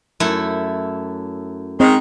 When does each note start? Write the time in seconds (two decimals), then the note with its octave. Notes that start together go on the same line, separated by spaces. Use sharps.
0.20 F#2 A3 E4
1.80 D#3 G#3 C4